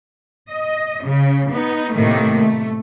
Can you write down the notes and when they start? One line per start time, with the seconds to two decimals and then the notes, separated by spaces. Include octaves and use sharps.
0.50 D#5
1.03 C#3
1.50 B3 D#4
1.94 A2 C3 D#3 A3 A#3
2.40 A3